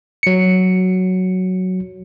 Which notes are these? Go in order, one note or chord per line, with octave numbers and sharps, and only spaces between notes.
F#3 C#7